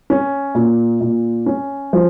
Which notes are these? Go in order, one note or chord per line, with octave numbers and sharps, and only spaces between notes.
C#4
A#2
A#2
C#4
F3